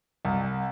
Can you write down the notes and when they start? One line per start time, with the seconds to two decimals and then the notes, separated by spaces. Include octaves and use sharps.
0.25 C2